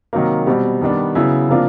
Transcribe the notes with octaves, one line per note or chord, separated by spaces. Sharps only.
C3 D#3 F#3 A#3
B2 G3 C4
D#3 G3 B3 D4
C#3 F#3 B3 E4
C3 F3 A#3 D4 F4